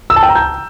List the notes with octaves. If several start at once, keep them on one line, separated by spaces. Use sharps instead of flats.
E6
A5
G5
A#5
G6